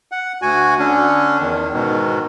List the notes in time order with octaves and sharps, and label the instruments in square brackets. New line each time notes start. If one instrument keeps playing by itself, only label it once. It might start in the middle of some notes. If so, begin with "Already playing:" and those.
[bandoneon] F#5
D2 F#4 G#5
D3 C#4 D4
E2 D#3
G#2 B2 D#3